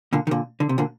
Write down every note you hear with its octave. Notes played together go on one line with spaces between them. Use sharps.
A#2 D3
D#3
A#2 D3
D3
C3
A#2 D3